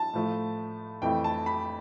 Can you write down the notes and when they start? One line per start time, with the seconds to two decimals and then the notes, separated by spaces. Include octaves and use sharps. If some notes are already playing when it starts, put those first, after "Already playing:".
Already playing: A5
0.13 A2 F3 A3
1.02 F2 E3 A3 G5
1.24 A5
1.46 B5